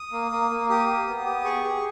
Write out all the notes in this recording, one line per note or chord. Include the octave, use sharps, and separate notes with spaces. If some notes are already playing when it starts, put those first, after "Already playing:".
Already playing: D#6
A#3
A#3
A#3
G4 D#6
G4
B3
G4
G#4 C#6
G#4